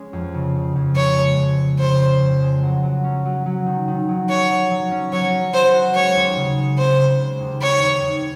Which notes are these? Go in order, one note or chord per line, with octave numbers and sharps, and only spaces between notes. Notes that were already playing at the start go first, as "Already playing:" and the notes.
Already playing: G#3 C#4
F2
C#3
C#3
F2
C#3 C#5
G#3
F2
G#3
C#3 C5
C#4
F2
G#3
F#3
F#3
C#4
F#3
F#3
D#3
D#3
F#3
F#4 C#5
F#3
F#3
C#4
F#3 C#5
C#4
F#3 C5
F#4
G#3 C#5
D#2
C#3
G#3
C4 C5
C#3
G#3
D#2
C4 C#5
D#2
D#2